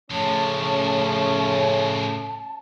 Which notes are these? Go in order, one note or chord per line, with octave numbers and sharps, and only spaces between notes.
A2 C#3 F3 A3 C#4 A5